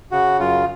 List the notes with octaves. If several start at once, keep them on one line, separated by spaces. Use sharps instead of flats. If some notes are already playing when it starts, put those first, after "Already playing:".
C#3 F#4
F#2 F4